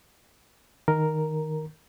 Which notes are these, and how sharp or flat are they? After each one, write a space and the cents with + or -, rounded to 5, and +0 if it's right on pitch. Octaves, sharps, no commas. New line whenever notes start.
D#3 +0 A#4 +0